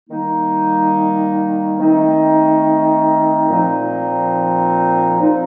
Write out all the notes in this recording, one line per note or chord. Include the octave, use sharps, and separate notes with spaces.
D#3 G3 A#3 D#4
D#3 A3 C4 D#4
A#2 F3 C4 D#4
F3 C4 D#4